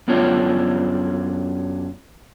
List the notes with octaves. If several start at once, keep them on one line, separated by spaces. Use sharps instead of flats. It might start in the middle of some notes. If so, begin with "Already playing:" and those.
F#2 B3 D4 F4 C#5